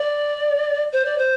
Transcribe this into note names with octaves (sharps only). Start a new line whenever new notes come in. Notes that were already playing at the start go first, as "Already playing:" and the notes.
Already playing: D5
C5
D5
C5